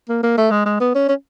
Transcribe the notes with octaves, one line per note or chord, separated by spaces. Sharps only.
A#3
A#3
A3
G#3
G#3
B3
C#4
C#4